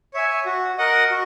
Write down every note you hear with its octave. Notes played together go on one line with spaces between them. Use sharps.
C#5 E5 G#5
F#4
A#4 D#5 F#5
F#4